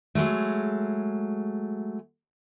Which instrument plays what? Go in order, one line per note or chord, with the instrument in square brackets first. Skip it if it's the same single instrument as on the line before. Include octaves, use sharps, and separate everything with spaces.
[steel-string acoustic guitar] F#3 G#3 A3